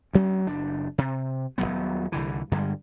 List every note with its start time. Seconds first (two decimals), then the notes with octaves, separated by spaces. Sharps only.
0.13 D2 F#3 C#4
0.46 F#1 D4
0.98 C3
1.58 D#1 E2 F#3 B3
2.12 C2 D3 E3
2.52 G2 D3 G3 G#3